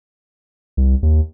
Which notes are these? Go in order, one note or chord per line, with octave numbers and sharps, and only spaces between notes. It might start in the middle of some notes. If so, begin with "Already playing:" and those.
C2
D#2